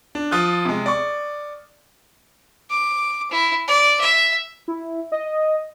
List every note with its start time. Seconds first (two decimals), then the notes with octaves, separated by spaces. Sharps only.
0.15 D4
0.31 F3 F4 D#6 F#6
0.65 C3 G#3
0.86 D5 C#6
2.70 D6
3.31 E4
3.68 D5
4.00 E5
4.68 E4
5.12 D#5